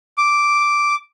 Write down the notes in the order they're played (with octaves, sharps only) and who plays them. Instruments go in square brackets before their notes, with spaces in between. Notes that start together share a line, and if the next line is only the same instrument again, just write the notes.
[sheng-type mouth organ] D6